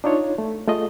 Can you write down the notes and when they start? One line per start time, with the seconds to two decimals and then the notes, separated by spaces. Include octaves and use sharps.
0.04 D4 D#4 F4 C#5
0.38 A3
0.68 A3 F4 G#4 D#5